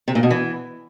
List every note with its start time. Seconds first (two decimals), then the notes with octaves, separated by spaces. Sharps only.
0.08 C3
0.15 A#2
0.23 B2
0.31 E3